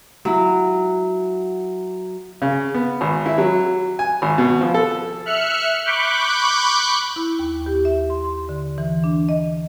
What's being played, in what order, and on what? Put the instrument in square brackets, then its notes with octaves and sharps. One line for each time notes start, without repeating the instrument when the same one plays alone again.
[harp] F#3 E4
[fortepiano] C#3
B3
G#1
E4
F#3
G#5
G#1
B2
F3
A4
[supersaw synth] E5 F6 F#6 C#7
B5 C#6 D6 F#6 G6
[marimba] E4
D#2
G4
E5
C6
C6
D3
E3
D4
D#5